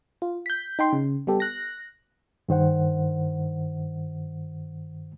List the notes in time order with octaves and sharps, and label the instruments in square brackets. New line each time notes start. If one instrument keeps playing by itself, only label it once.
[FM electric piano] F4
G6 B6
D#4 G5 C6
C#3
G3 B3 G4 A4
F#6 A#6
[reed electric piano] G2 D#3 C5 F#5